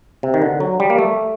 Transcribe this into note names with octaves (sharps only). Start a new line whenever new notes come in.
C3
D#3
D3
F#3
G3
A#3
A3